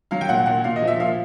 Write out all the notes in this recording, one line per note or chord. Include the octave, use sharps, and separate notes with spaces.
F#3 F5
G5
A#2 F#5
A#2 F#5
A#2 F5
D#5
F3
E5
A#2 F5